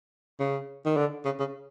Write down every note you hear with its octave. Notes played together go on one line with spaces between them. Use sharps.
C#3
D#3
D3
C#3
C#3